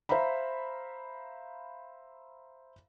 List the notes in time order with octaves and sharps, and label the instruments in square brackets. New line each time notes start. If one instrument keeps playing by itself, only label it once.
[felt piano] C5 E5 F5 A#5 B5